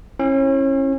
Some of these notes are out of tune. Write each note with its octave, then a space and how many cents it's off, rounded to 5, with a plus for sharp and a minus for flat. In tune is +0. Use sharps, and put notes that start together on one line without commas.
C#4 -35 E4 +0